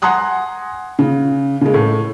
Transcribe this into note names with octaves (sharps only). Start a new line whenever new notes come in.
F#5 G#5 A#5 C6 D#6 F#6
C#3
C#3 G#3
A2